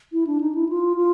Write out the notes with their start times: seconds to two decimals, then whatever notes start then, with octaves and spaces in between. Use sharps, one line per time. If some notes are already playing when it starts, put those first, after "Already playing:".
0.13 E4
0.27 D4
0.41 D#4
0.55 E4
0.69 F4
0.97 F4